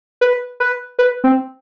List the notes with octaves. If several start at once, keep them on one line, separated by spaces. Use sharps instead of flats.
B4
B4
B4
C4